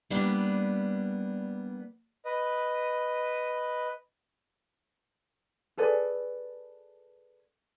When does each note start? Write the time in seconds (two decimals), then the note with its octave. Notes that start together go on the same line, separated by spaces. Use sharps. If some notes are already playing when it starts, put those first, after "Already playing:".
0.10 G3 A#3 B3 D4
2.25 B4 D#5
5.78 G#4 A4 B4 D5